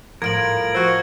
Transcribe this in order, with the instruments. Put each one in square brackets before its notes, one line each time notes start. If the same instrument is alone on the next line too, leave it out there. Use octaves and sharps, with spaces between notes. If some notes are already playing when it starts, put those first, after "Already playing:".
[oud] A2 F3 [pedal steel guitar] F4 A#4 [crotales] G#6 D7 F#7
[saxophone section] F4 F#4 C5 [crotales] E6